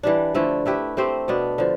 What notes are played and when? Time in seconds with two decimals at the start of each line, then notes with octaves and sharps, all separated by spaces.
0.03 E3 G3 D4
0.35 D3 F3 A3 E4
0.66 A3 E4 G4 B4
0.97 A3 C4 G4 C5
1.28 B2 B3 D4
1.58 D3 F3